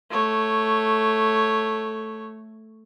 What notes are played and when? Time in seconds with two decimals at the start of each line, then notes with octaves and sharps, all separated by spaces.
0.10 A3 C#5